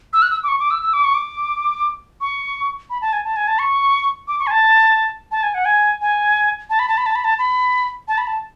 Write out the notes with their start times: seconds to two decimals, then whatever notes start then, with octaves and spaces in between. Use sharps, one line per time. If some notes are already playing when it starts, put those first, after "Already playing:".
0.13 E6
0.22 F#6
0.30 E6
0.44 D6
0.48 C#6
0.60 D6
0.71 E6
0.83 E6
0.93 D6
1.04 C#6
1.14 D6
2.21 C#6
2.90 B5
3.01 A5
3.13 G#5
3.24 A5
3.36 G#5
3.47 A5
3.59 C#6
4.28 D6
4.40 C#6
4.47 G#5
4.51 A5
5.32 A5
5.43 G#5
5.54 F#5
5.65 G#5
6.01 G#5
6.70 A5
6.79 B5
6.88 A5
6.97 B5
7.06 A5
7.15 B5
7.24 A5
7.39 B5
8.08 A5
8.18 B5
8.27 A5